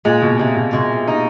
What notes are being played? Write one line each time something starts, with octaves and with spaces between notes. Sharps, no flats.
A#2 G#3
B2
C3 G#3
B2
B2 G#3
D#4